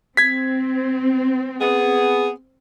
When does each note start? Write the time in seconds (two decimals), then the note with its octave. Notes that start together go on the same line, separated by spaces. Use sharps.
0.17 C4 G#6 B6
1.61 B3 G#4